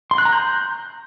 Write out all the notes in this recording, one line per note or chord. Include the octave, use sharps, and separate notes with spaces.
C6
F#6
A#5
G6